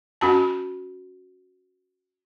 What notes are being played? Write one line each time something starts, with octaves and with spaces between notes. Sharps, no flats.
C#4 F#4 A5